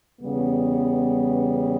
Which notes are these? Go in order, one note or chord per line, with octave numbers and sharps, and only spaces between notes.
E2 C#3 G3 B3